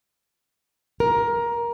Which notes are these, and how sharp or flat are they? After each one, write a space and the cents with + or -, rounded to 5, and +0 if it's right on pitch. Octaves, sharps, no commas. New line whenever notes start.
A#4 +15